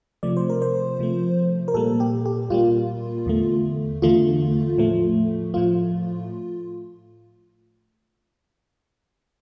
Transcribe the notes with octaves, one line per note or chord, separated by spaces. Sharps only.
C3 F3 A3 D5
C5
A#4
C5
C3 F3 A3
A#4
A#2 G3 A#3 A4
G4
G4
A#2 G3 A#3 F4
E2 D3 A3
E2 D3 A3 F4
A2 F3 A3
A2 F3 A3 F4